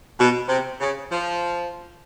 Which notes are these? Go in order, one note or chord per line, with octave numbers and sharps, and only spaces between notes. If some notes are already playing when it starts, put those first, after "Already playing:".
B2
C3
C#3
F3